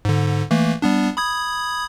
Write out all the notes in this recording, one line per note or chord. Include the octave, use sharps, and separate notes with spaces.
G#2 D3
E3 A3 A#3
G3 B3 D4
B5 D#6 G#6